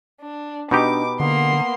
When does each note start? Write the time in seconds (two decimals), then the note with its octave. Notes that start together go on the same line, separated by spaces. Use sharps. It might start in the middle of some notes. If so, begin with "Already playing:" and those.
0.21 D4
0.71 B2 D4 D#4 G4 B4 D6
1.20 D3 A#3 B3 C6